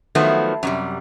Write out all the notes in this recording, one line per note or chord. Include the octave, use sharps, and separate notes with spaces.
D#3 F3 F#3 A3 B3
F#2 C3 G3